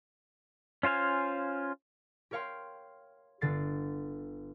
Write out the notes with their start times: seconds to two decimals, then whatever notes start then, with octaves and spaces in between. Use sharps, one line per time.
0.83 C#4 F4 C5 F5 G#5
2.31 G4 A#4 C#5 F5 G5 C6
3.41 G1 D3 A6 C7